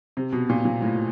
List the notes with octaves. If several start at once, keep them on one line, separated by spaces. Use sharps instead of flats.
C3
B2
A#2
A#2
A2